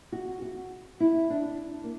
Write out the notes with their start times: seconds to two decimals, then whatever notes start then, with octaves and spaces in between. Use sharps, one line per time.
0.12 F#4
0.42 F#4
1.00 E4
1.30 D4
1.84 A#3